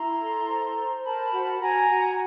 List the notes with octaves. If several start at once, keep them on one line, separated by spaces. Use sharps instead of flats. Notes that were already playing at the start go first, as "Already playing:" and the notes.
Already playing: E4 A#5 C6
A4
C5
C5
A#4 A5 B5
F#4
F#4 G#5 A#5
F#4